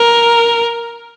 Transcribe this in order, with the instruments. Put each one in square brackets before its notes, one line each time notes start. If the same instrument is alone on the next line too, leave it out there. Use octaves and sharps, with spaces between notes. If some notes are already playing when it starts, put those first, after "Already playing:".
Already playing: [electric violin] A#4